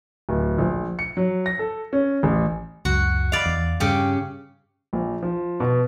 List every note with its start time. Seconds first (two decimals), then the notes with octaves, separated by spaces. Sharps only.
0.29 D1
0.58 A#1
0.99 C#7
1.17 F#3
1.46 A#6
1.59 A4
1.93 C#4
2.23 A1
2.85 C#2 F#2 F#4
3.32 D5 D#5 F5 B5
3.46 E2
3.80 G2 C#3 G4
4.93 A#1
5.22 F3
5.60 B2